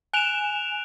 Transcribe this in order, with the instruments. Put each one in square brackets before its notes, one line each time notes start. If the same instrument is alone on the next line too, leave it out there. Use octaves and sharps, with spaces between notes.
[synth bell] G#5 E7 [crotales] F#6 D7 F7